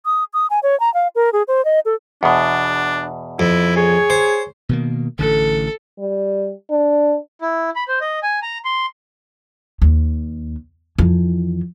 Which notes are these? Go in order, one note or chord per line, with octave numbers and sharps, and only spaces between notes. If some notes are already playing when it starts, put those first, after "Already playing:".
D#6
D#6
G#5
C#5
A#5
F5
A#4
G#4
C5
D#5
A4
E2 B2 D4
F2 E4
G#4 C#5
C5
B2 D#3 A#3
A1 D3 A4
G3
D4
E4
B5
C5
D#5
G#5
A#5
C6
D#2
F2 E3